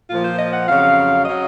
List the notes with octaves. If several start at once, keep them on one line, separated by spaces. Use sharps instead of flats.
A#2 F3 F4
C5
D#5
F#5
F2 C#3 F#3 F5
C#3 F#3 D#5